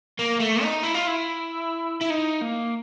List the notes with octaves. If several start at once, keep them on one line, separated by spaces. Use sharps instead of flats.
A#3
A3
D#4
E4
F4
E4
E4
D#4
A#3